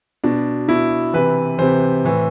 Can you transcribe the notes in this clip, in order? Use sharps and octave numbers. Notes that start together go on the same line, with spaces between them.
B2 D4
B2 E4
C3 E3 B4
C3 E3 C5
A2 E3